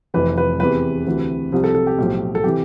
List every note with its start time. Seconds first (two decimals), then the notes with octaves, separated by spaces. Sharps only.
0.14 F1 F2 E3 B4
0.38 B4
0.60 E2 C3 E3 B4
1.06 D2 C3 E3
1.52 C2 C3 F3
1.64 A4
1.75 A4
1.87 G4
1.98 B1 A2 F3
2.35 A4
2.44 C3 E3 G4